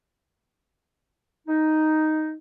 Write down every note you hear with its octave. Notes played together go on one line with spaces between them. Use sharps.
D#4